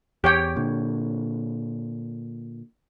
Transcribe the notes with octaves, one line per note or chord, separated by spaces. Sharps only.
E2 G4 C#5 G5
A#2 D3